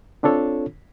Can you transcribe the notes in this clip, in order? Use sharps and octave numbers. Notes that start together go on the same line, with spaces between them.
C4 D4 F4 A4 C#5